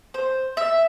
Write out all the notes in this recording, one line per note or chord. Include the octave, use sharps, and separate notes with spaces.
C5
E5